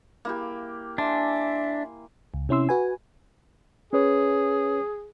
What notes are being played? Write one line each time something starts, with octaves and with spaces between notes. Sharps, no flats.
A#3 E4 G4
D4 E5 G#5 C6
C#2
C3 C#4 E4 C6 E6
F#4 B4 G#5
C#4 G#4 B4 C#5